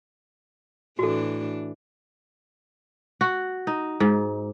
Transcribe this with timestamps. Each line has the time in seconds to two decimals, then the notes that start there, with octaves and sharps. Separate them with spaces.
0.99 A2 E3 D4 F#4 A4
3.21 F#4
3.67 D#4
4.00 G#2